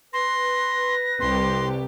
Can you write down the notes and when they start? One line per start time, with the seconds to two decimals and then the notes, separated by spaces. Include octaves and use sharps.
0.13 B4 C6 A#6
1.20 C2 G4 C6